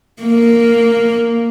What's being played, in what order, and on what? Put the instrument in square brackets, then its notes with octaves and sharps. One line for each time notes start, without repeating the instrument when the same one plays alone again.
[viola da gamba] A#3